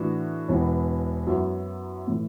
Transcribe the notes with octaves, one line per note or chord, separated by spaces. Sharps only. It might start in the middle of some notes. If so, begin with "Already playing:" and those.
Already playing: A2 E3 D4 F#4
E1 E2 E3 B3
F#2 F#3 B3 E4
A2 E3